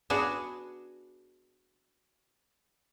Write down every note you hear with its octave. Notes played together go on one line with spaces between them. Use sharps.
B3 D4 F#4 G#4